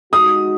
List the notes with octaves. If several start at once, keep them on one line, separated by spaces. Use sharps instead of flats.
G#3 D#4 F#4 D#6